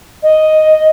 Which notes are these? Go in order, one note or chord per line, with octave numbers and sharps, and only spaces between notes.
D#5